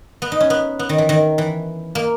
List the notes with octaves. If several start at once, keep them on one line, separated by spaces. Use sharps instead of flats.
B3
D#4
C#4
B3
B3
D#3
E3
D#3
E3
A#3